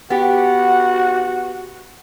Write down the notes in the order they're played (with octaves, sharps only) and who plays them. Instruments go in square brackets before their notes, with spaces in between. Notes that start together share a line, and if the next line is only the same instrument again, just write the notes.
[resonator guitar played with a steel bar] B3 G4 [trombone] F#4 [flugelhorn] F#5